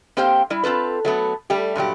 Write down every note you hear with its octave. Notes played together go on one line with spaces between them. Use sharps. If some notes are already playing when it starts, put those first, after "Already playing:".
A#3 C4 G4 C5 F5 G5
G3 E4
C4 F4 A4 B4
F#3 A3 B3
G3 A3 G4
G2 A#2 F#3 G4